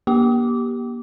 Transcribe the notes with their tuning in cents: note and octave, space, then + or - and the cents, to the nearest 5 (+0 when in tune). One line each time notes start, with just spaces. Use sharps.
A#3 +40 G4 +0 D6 -15